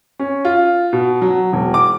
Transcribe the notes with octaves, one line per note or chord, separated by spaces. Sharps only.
C#4
F4
B2
F#3
E1
D6